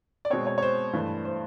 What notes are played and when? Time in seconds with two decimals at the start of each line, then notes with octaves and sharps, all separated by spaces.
0.25 D5
0.30 B2 G#3 C4 C#5
0.47 C#5
0.58 C#5
0.62 C5
0.93 G2 E3 A3
1.25 C5